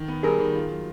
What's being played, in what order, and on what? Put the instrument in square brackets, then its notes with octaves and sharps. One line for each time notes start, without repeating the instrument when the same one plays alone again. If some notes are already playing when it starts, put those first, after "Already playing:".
Already playing: [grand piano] D#3
B3
[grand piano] G3 [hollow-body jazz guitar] G#4 A#4
[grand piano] D#3
F4
F#3